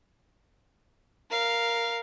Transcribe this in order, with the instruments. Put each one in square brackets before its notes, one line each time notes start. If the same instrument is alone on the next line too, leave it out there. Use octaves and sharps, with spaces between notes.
[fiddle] A#4 F5